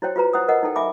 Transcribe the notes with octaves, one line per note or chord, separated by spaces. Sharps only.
E4 F#4 C5 C#5 G5
F4 F#4 B4 A#5
E4 C5 F#5 G5 D#6
A#4 D#5 F#5
D#4 E4 A4 G5
E5 G#5 B5 D6